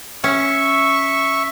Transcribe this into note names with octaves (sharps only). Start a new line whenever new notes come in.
C#4 E5 C#6